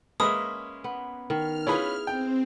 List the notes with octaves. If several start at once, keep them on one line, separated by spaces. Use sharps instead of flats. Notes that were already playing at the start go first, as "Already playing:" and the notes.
G#3 A#3 C#4 B4 E5 D#6
B3
D#3 F6
C#4 E4 F4 G#4 B4
C4 G5